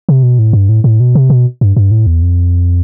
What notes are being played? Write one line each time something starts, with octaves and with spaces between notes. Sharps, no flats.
C3
B2
A2
G2
A2
A2
B2
C3
B2
G2
G2
A2
E2
F2